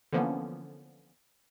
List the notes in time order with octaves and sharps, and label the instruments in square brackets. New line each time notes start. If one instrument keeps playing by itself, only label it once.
[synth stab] D3 E3 F3 A#3 B3 C#4